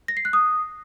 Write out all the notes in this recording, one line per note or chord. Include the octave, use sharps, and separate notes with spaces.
A#6
C7
F#6
D#6